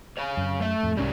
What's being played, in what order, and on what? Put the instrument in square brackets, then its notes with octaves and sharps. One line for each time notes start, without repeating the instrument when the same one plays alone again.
[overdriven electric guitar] C#5 F5
[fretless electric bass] F#2
[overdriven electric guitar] A3 E5
[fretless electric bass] F2 A2
[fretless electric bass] C2 G#2 [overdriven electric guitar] G3 C#4